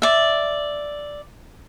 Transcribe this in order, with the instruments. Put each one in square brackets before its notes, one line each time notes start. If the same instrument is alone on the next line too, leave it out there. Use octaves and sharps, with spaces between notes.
[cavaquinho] D5 E5